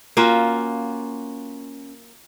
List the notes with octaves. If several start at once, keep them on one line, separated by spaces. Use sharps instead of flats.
A#3 C#4 F4 F#4